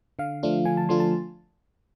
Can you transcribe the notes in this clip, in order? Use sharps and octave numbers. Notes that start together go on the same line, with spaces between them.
D3 F5
F3 A3 D4 F4
D3 G#5
A5
F3 A3 D4 F4 C6
A5